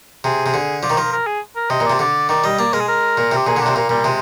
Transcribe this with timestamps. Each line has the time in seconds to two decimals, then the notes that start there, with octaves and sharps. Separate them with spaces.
0.24 C3 G#4
0.46 C3
0.54 D3
0.83 F3 D5
0.90 D#3
0.98 F3 A#4
1.12 A#4
1.27 G#4
1.56 A#4
1.70 C3 D#5
1.80 A#2
1.86 C3 D5
1.99 D3 D5
2.29 D#3 D5
2.44 G3 D#5
2.59 A#3 D5
2.73 G#3 A#4
2.80 G#4
2.88 A#4
3.17 A#2
3.31 C3
3.37 G4
3.46 A#2 G#4
3.56 D3 D4
3.66 C3
3.75 A#2 A#3
3.89 A#2 G3
4.04 C3 G#3